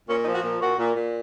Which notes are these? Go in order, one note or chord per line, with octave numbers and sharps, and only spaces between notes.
A#2 C#4
D#4
F3
F#4
A#2
A#2 F#4
A#2
A#2